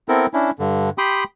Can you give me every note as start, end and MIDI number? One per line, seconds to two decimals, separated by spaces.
0.09 0.26 59
0.09 0.26 60
0.09 0.26 64
0.09 0.26 69
0.09 0.26 70
0.33 0.51 61
0.33 0.51 62
0.33 0.51 64
0.59 0.90 43
0.59 0.90 50
0.98 1.24 67
0.98 1.24 79
0.98 1.24 83
0.98 1.24 84
0.98 1.24 87